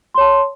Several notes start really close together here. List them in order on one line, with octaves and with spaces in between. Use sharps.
C6 C#5 A5